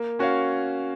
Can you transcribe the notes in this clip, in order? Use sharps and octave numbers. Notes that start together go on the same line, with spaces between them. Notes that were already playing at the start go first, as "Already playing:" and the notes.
Already playing: A#3
C#4 F#4 C#5 F5